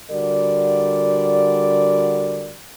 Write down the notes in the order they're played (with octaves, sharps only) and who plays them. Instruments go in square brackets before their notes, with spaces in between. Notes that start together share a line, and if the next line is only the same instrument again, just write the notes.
[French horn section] D3 G3 F#4 A#4 D5